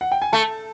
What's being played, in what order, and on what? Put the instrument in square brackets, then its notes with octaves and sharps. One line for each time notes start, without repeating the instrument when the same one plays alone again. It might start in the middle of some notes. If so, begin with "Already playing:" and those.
[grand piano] F#5
G5
G#5
[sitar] A3 [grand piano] A5